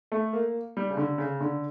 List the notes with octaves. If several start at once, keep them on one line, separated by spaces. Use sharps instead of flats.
A3
A#3
G3
C#3
D3
C#3
D3